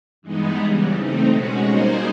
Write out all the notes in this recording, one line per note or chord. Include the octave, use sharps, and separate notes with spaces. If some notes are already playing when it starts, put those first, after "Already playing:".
G2 E3 G#3 B3 D#4
C#3 E3 G3
A3 C4 D#4
B2 G#3 C#4 F#4
G3 A#3 D#4 G#4 C5